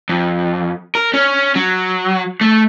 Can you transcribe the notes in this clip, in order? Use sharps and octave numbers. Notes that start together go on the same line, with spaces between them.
F2
A#4
C#4
F#3
A3